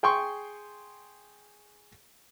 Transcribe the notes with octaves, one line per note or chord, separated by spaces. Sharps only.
G#4 G5 C6 C#6